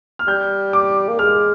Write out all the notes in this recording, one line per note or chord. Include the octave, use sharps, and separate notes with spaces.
F6
G3 G6
D6
A#3
G#3 F6